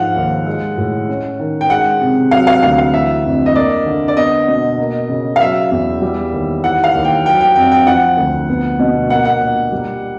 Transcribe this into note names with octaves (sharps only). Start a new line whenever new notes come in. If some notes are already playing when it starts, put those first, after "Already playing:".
Already playing: G#2 F3 F5 F#5
D#2
G#3
A2
C#4
D#3
G5
G#3 F#5
C3
F#3 F5
F5
D2 F5
F5
E3 E5
F2
D#5
A#3 D5
D3
D5
B3 D#5
B2
A#3
C#3
F5
F#3 E5
E2
G3
D#2
E3 F#5
F5
D#2
G5
F#3 G5
G5
F2 G5
G5
F3 F#5
D2
B3
B2
A#3 F#5
F#5
A#2
G3